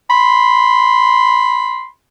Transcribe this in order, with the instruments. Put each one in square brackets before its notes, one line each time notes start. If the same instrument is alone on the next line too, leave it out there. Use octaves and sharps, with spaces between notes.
[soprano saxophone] B5 [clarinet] C6